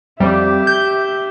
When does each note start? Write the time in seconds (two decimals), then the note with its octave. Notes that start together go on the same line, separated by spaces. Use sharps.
0.20 F2 G3 G4 E5
0.67 G6